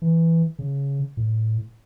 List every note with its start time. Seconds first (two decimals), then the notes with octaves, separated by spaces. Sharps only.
0.02 E3
0.59 C#3
1.17 A2